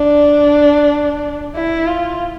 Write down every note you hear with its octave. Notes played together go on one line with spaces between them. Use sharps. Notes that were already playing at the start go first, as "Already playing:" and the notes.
Already playing: D4
E4
F4